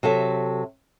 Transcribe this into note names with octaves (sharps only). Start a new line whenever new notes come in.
C3 F#3 A4 E5